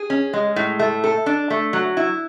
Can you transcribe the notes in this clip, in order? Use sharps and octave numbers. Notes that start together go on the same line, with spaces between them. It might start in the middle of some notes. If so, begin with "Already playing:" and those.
Already playing: G#4
C#4
G#3
A2
A3
A4
D4
A3
F#3
E4